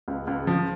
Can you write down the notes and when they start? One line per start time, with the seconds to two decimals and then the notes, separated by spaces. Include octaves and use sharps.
0.08 C#2
0.27 C#2
0.47 F3